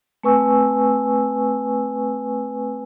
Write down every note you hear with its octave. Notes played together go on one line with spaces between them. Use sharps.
A3 C4 B4 G#5 C#6 E6